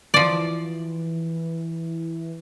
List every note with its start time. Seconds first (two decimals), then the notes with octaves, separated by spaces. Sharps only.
0.14 E3 F3 D5